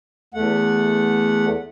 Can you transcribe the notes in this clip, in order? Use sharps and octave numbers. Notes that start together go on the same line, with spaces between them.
E2 A3 F#5